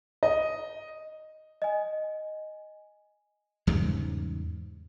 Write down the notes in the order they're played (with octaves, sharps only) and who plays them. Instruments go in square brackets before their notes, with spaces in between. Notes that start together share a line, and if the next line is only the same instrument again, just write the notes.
[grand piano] D#5
[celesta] D#5 G#5
[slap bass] E2 G#2 C#3 G3